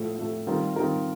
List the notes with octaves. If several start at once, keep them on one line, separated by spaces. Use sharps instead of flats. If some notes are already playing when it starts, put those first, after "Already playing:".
Already playing: A2 F3 A3
A2 F3 A3
D#3 G3 C4 F4 A#4
D#3 G3 C4 F4 A#4